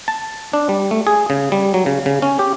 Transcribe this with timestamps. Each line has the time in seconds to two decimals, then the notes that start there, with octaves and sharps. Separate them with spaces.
0.08 A5
0.53 D4
0.69 G3
0.91 A3
1.07 G#4
1.30 C#3
1.52 G3
1.74 F#3
1.86 C#3
2.06 C#3
2.22 C#4
2.39 G4